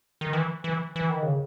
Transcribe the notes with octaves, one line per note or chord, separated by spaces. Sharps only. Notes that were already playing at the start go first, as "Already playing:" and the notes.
D#3
E3
E3
E3
D#3
C#3